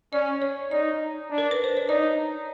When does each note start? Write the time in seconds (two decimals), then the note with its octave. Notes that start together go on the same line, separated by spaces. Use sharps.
0.13 C#4 D5
0.42 C#5
0.71 D#4 D5
1.30 D4
1.38 A#4
1.51 B4
1.64 C5
1.77 C#5
1.89 D#4 D5